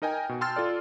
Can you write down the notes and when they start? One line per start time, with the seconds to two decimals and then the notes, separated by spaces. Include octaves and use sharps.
0.02 D#4 A#4 D#5 G5 G#5 A#5
0.29 B2
0.41 G5 A5 C6 E6 F6 A6
0.56 F4 A4 D5